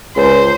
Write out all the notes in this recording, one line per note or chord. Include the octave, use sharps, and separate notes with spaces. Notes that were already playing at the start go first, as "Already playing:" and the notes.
C#2 C5